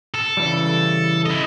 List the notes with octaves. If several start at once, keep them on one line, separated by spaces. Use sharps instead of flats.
A4
C#3 E3 G3
E4 D#5